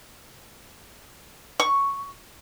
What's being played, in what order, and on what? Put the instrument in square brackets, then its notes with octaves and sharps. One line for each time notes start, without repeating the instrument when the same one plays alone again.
[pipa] C#6